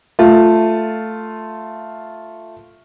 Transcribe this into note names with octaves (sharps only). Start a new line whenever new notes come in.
A3 F4